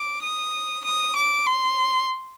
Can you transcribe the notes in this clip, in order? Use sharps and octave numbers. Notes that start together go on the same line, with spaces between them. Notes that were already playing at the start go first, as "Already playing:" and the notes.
Already playing: D6
D#6
D#6
D6
C6